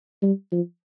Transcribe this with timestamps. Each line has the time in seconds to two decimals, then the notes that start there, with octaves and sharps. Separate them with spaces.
0.22 G3
0.52 F3